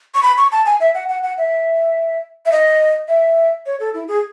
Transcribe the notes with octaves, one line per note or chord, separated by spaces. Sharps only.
C#6
B5
C#6
A5
G#5
E5
F#5
F#5
F#5
E5
E5
D#5
E5
C#5
A4
E4
G#4